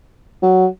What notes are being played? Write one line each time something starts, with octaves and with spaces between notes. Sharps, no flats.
F#3